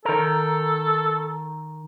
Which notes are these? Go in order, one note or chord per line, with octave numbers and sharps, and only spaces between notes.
D#3 A4 A#4